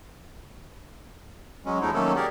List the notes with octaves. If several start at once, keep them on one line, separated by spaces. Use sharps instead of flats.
F#3 G#3 C#4
E2 F3 G#3 A3 D#4 E4
D#3 F#3 A3 A#3 C#4 A4
G4 G#4 A#4 D5